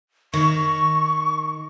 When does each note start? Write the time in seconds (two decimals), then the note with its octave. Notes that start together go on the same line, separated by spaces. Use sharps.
0.34 D#3 C#6